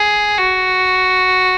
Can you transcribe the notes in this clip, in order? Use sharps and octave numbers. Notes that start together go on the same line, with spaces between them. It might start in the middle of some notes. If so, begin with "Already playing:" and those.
Already playing: G#4
F#4